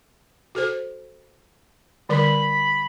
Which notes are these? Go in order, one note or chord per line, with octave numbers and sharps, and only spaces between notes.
F#4 A4 C5
D3 G3 A#4 B5